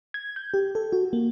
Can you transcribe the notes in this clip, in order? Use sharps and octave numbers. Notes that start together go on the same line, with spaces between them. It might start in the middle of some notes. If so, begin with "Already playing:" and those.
G#6
G6
G4
A4
F#4
A#3